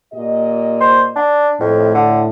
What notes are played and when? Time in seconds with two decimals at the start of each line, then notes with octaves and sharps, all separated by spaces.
0.13 A#2 G4 D#5
0.81 C5
1.16 D4
1.60 F2 A2
1.94 D3